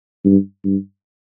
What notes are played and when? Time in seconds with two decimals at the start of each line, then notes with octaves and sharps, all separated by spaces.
0.25 G2
0.64 G2